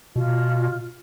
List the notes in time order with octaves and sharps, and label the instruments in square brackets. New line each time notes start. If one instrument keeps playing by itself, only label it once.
[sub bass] B2 [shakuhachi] F4